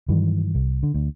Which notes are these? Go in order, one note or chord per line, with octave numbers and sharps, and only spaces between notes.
G2 D#3 E3 F#3
C2
D3
D2